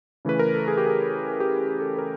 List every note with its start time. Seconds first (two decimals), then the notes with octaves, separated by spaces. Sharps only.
0.25 C#3 E3 A3 C#4 B4
0.39 A#4
0.54 A4
0.68 G#4
0.77 G4
0.86 G#4
1.40 G4
1.80 A4
1.99 A#4